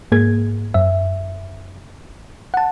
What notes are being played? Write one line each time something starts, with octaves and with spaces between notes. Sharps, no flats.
G#2 A#3 G#4 G#6
F#2 E5
F#5 A5